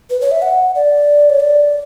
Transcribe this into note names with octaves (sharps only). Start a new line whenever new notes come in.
B4
C#5
E5
F#5
D5
C#5
D5